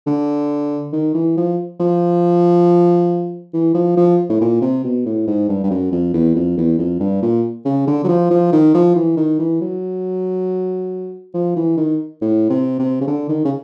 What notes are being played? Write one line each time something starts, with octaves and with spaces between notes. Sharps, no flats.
D3
D#3
E3
F3
F3
E3
F3
F3
A2
A#2
C3
B2
A2
G#2
G2
G2
F#2
F2
E2
F2
E2
F2
G2
A#2
C#3
D3
F#3
F3
F3
D#3
F3
E3
D#3
E3
F#3
F3
E3
D#3
A2
C3
C3
C#3
D3
D#3
C#3